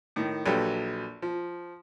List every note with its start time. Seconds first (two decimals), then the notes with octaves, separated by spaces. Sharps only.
0.16 A2 D#3
0.46 A#1 F#3 G4 A4 B4
1.22 F3